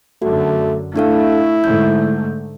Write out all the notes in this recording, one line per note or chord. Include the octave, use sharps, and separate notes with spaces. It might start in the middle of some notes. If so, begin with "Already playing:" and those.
F#2 D3 A3 F#4
A3 D4 E4 A4 F5
G#2 D3 A3 G6